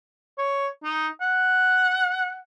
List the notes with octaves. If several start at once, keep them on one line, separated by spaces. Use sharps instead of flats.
C#5
D#4
F#5